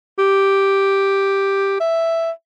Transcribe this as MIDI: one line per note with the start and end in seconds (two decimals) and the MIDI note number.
0.18 1.78 67
1.80 2.31 76